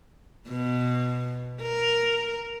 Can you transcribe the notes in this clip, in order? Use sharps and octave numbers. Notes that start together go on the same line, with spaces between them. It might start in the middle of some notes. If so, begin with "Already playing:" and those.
B2
A#4